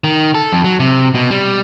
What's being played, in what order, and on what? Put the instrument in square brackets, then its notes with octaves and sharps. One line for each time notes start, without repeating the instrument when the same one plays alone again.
[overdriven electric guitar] D#3
A4
F2
F#3
C3
B2
G3